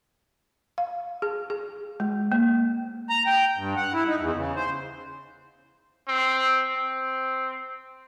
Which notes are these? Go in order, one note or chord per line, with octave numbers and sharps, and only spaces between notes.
F5
G#4
G#4
G#3
A#3
A#5
G5
G2
F#5
E4
D#4
E2
C#3
C5
C4
C4